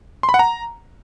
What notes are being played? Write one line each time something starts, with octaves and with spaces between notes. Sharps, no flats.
C6
B5
F#5
A#5